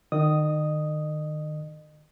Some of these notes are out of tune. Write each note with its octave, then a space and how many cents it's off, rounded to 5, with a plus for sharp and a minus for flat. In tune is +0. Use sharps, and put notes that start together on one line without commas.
D#3 -30 D#5 -35 D#6 +0